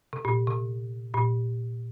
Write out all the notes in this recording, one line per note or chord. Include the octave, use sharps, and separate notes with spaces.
C3
A#2
C3
A#2